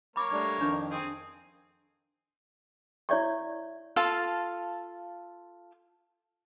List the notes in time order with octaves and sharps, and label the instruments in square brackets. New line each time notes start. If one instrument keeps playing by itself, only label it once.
[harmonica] A#3 A#4 C#5 [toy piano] B5 D6
[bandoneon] G3 A3 D4
[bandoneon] F2 D#3 F3 [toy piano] D4
[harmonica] C4 G#4
[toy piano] E4 C#5 D5 E5 C#6
[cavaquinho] F4 A4 F5 A5